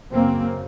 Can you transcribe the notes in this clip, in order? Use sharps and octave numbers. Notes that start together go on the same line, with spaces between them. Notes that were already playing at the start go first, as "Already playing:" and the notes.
F#2 C#3 A#3 C4